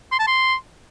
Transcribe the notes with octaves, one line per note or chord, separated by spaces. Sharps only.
C6
A5
C6